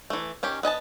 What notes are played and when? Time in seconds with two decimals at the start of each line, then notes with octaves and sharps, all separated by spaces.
0.10 E3 A3
0.43 D#3 C#4 G4
0.63 B3 D#5 G#5 A5